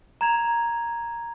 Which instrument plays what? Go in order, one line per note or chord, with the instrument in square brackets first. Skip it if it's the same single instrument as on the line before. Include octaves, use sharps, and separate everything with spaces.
[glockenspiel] A#5 G#6 F7